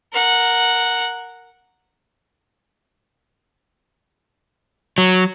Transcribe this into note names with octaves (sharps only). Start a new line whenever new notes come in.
A#4 F#5
F#3